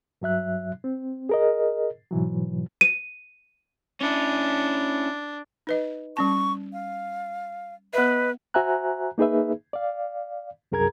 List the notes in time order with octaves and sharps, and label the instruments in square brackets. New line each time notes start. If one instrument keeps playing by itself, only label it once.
[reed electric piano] G2 F#3 E5 F#6
C4
G#4 A#4 D#5
G#2 B2 E3 F#3
[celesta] D#7
[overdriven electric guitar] C#4 E4 [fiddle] D4
[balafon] D#4 B4 D#5
[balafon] G3 C#4 A5 [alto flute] C#6
[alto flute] F5
[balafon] B3 E5 [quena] B4 [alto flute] D#5
[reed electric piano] F#4 C5 E5 G#5 A#5 F#6
A#3 D#4 G#4 B4 E5
D5 F5
C2 F#2 G#4 A#4 A#5 G#6